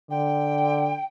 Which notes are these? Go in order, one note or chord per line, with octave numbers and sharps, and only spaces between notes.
D3 G5